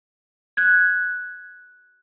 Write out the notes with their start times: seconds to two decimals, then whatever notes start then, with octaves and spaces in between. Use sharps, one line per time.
0.57 F#6 G#6